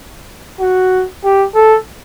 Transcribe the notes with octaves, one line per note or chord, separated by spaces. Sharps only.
F#4
G4
A4